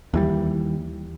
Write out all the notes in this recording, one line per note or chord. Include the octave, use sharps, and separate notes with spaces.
D#2 E3 G3